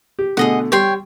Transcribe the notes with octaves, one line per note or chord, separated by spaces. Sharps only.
G4
B2 D3 A3 G#4 D#5 F#5
G3 C#5 G5 C6